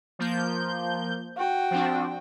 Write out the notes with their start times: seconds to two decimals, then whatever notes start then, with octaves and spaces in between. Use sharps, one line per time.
0.19 F3 A#3 G6
1.37 F#4 G5
1.71 F3 C4 D4